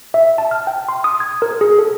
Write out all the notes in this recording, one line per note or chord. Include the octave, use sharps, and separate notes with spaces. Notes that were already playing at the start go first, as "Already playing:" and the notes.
E5
A5
F6
G5
C6
D#6
G#6
A#4
G#4
A4